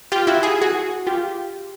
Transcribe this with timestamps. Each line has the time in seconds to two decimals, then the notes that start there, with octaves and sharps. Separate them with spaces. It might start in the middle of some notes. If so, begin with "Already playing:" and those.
0.12 F4 G4
0.27 E4 F#4
0.43 G#4
0.62 F#4 G#4
1.07 F4 G4